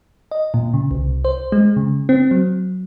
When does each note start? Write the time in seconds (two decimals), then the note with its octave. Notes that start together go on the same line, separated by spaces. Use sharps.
0.31 D#5
0.54 A#2
0.74 C#3
0.91 C2
1.25 C5
1.52 G#3
1.77 C#3
2.09 C4
2.31 F#3